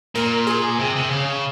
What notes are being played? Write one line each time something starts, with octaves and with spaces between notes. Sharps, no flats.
A#2 A#4
G#4
C3
C3
C#3